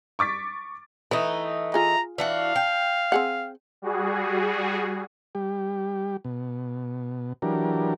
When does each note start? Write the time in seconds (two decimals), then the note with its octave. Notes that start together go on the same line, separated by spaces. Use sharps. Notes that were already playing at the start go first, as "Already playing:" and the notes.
0.19 C#6 D6 A6 B6
1.11 E3 A3 D#4 B4
1.74 F4 G#4 A#5
2.18 E3 D4 F#4 F5
2.56 G5
3.12 C4 G#4 F#5
3.82 G3 F#4 G#4
5.35 G3 G4
6.25 B2
7.42 E3 F#3 D4 G4 A#4